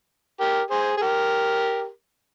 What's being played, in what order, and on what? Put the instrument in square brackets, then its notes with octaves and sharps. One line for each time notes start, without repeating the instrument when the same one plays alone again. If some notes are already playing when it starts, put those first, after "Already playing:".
[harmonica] G4 A#4
G#4 C5
G#4
G4 A#4